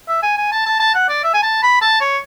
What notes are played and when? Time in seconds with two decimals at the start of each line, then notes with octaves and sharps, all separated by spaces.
0.08 E5
0.23 G#5
0.37 G#5
0.52 A5
0.66 A5
0.80 A5
0.94 F#5
1.09 D5
1.24 E5
1.34 G#5
1.43 A5
1.62 B5
1.81 A5
2.01 C#5